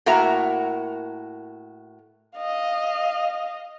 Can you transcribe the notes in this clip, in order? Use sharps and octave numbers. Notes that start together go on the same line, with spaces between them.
A2 A#3 F#4 A#4 E5 A#5
D#5 F5